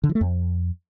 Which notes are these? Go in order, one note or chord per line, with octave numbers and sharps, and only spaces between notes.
D3
E3
A3
F2